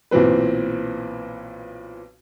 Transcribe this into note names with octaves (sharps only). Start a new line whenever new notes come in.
B1 A#2 E3 C4 B4